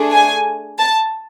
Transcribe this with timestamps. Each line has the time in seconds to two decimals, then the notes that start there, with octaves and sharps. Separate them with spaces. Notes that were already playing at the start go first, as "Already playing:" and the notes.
Already playing: A3 D4 G#4
0.12 G#5
0.80 A5